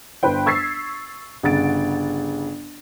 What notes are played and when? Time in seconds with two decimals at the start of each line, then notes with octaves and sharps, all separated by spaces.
0.23 G1 B4 C5 G5
0.46 C#6 E6 G#6 A6 B6 C7
1.43 G1 C#3 F#5 A6 D7